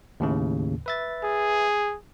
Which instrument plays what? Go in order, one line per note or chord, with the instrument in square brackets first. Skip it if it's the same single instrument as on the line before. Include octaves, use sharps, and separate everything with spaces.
[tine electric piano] D#2 A2 C#3
B4 E5 A6
[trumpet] G#4